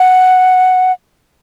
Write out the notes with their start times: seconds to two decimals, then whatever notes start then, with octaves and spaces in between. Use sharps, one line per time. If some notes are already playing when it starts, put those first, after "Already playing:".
Already playing: F#5